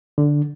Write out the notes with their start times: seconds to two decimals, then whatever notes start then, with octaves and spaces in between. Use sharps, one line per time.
0.18 D3